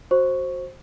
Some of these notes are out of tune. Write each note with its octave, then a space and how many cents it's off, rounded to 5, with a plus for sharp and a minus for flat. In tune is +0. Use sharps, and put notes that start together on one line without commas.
F#4 +0 C5 +15 C#6 +5